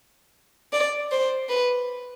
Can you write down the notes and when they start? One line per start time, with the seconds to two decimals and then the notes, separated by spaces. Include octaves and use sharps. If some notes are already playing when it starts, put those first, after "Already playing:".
0.73 D5
1.12 C5
1.49 B4